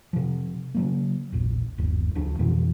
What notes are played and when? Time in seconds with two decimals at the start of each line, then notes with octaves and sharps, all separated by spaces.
0.13 C3 F3
0.75 C#3 F#3 A#3
1.32 E1 A#1
1.78 G1 D#2
2.15 D2 C#3 F3 D4
2.39 F2 B2 E3 F3